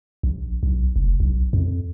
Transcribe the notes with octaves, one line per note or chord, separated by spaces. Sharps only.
A#1
B1
F1
B1
F2